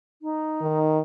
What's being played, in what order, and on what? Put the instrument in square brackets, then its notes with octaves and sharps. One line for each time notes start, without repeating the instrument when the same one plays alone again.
[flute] D#4
[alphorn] D#3